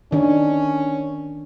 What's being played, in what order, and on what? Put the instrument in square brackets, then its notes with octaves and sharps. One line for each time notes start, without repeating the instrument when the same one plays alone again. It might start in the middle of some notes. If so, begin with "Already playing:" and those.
[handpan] D#3 D4 [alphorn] C#4